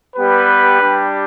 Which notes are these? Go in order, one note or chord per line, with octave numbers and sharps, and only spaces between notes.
G3 B3 G4 B4
G3 D4 G4